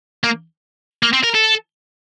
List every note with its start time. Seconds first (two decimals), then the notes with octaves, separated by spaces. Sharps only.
0.24 A#3
1.03 A#3
1.13 C4
1.24 A#4
1.35 A4